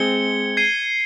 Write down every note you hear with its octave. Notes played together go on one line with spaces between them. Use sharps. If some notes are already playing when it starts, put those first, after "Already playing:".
Already playing: G#3 C4 G#6 C#7 G7
G#6 C7 D#7 G7